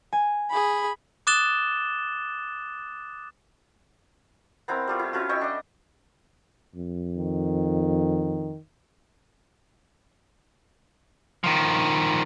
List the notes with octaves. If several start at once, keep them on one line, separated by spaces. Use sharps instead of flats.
G#5
G#4 B5
D6 D#6 F#6 A6 E7 G7
B3 C4 E4 A#4
G3 A3 F4
E4
A3 C#4 E4 F#4
D#5 E5 G5 C#6
D4 D#5
F2
D#3
D#3 F3